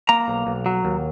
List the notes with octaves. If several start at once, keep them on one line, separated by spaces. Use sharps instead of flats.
A#3 A#5
B1
B1
F#3
D#2